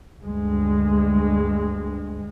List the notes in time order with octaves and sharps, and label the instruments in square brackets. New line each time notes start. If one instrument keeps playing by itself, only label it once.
[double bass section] D2 G2 G#3